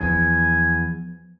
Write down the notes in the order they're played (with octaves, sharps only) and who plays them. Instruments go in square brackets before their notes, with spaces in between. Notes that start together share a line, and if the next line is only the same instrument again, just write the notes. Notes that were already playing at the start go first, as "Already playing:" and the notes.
[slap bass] E2 [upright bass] F3 B3 [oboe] G#5